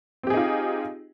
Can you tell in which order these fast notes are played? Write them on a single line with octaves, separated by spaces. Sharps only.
C4 G4 G#4 D#4 F4